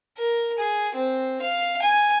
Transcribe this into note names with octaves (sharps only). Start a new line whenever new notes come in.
A#4
G#4
C4
F5
G#5